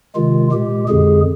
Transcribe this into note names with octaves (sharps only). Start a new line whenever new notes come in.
C3 D#3 G#3 F4
A#2 G#3 G4
F2 D3 G#3 G#4